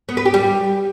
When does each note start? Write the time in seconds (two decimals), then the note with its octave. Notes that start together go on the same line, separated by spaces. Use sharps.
0.09 B3
0.17 B4
0.25 G4
0.34 G3